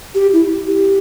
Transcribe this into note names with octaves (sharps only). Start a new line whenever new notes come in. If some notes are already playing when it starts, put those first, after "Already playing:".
G4
E4
G4